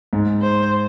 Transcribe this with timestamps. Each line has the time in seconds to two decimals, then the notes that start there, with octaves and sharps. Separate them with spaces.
0.13 G#2
0.42 C5